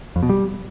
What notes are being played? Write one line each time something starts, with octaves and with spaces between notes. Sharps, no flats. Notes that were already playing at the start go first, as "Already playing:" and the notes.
F2
B2
G3